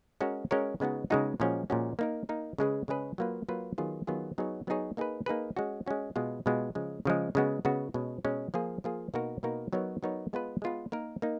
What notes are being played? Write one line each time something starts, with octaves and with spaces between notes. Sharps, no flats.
G#3 C#4 F#4 A#4 C#5
G#3 C#4 F#4 A#4 C#5
C#3 G#3 B3 D#4 F#4
C#3 G#3 B3 D#4 F#4
A#2 F3 G#3 C#4 F#4
A#2 F3 G#3 C#4 F#4
A#3 D#4 A#4
A#3 D#4 A#4
C#3 G#3 C#4 G#4 B4
C#3 G#3 C#4 G#4 B4
F#3 A#3 F4 B4
F#3 A#3 F4 B4
D#3 F#3 B3 F4 G#4
D#3 F#3 B3 F4 G#4
F#3 B3 D#4 G#4 C#5
F#3 B3 D#4 G#4 C#5
A#3 D#4 G#4 B4
A#3 D#4 G#4 B4
G#3 C#4 F#4
G#3 C#4 F#4
B2 G#3 B3 F4
B2 G#3 B3 F4
C#3 F3 G#3
C#3 F3 G#3
C#3 G#3 B3 F#4
C#3 G#3 B3 F#4
B2 G#3 C#4
B2 G#3 C#4
F3 A#3 F4 G#4
F3 A#3 F4 G#4
B2 A#3 D#4 F#4 A#4
B2 A#3 D#4 F#4 A#4
F#3 B3 D#4 A#4 C#5
F#3 B3 D#4 A#4 C#5
G#3 B3 F4 B4
G#3 B3 F4 B4
A#3 D#4 A#4
A#3 D#4